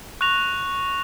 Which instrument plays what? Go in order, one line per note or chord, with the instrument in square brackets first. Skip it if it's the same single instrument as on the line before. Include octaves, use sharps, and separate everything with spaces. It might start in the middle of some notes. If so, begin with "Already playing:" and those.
[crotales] C#6 F#6 A#6 F7